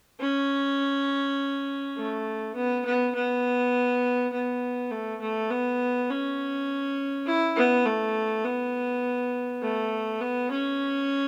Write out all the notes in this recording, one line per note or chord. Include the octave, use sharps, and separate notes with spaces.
C#4
A3
B3
B3
B3
B3
A3
A3
B3
C#4
E4
B3
A3
B3
A3
B3
C#4